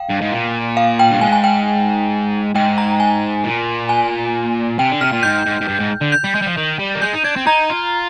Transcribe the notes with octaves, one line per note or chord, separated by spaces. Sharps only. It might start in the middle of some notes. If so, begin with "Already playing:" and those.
Already playing: F5 G5
G2
G#2
A#2
F5
G5
G2
G#2 G#5
G#5
G5
G#2 G5
A#5
G#5
A#2
G#5
C3 G5
D3
C3 F6
A#2
G#2 G6
G#2
G#2
G2
G#2
D3
G6
G3
G#3
G3
F3
D#3
G3
A#3
G#3 G6
D#4
D4 G#6
C4
D#4 A#5
F4